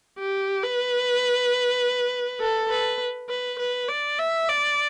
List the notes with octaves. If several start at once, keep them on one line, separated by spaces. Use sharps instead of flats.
G4
B4
A4
B4
B4
B4
D5
E5
D5